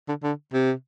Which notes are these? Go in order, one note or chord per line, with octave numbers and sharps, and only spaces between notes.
D3
D3
C3